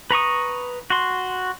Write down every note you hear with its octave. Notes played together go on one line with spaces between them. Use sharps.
B4 A#5 C#6 D#6
F#4 C6